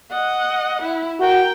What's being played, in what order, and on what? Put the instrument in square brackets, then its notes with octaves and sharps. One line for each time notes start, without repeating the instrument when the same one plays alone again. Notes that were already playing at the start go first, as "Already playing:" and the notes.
[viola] D#5 F#5
E4
[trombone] F#4 [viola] A#4 G5